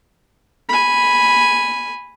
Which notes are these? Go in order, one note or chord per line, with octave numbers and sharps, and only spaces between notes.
G#5 B5